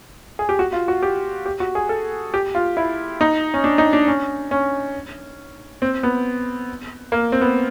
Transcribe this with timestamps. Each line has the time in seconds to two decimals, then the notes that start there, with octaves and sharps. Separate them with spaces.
0.39 G#4
0.49 G4
0.59 F#4
0.73 F4
0.88 F#4
1.03 G4
1.46 G4
1.60 F#4
1.75 G#4
1.89 A4
2.34 G4
2.55 F4
2.77 E4
3.21 D#4
3.54 C#4
3.64 D4
3.78 D#4
3.93 D4
4.07 C#4
4.51 C#4
5.82 C4
6.03 B3
7.12 A#3
7.32 C4
7.41 B3